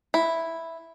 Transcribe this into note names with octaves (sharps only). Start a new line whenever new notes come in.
E4